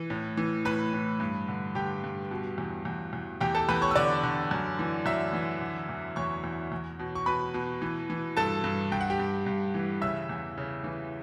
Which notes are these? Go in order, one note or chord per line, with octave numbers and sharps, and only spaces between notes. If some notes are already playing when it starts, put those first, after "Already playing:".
Already playing: E3
A2
E3
A2 B4 B5
A2
G2
D3
D3 G4 G5
G2
B2
E2
E2
E2
E2 G4 G5
A4 A5
E2 B4 B5
C#5 C#6
E6
D3 D5 D6
D3
F#2
E3
F#2 E5 E6
E3
D3
E2
E2 C#5 C#6
E2
E2
B2
C#6
B2 B4 B5
B2
E3
E3
G2 A4 A5
G2
G2 G5
F#5
G4 G5
G2
G2
E3
C#3 E5 E6
E2
C#3
E3